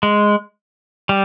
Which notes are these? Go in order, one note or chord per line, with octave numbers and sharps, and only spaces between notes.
G#3
G3